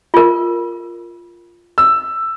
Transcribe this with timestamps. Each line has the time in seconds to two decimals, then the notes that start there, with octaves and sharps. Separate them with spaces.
0.14 F4 A#4
1.78 E6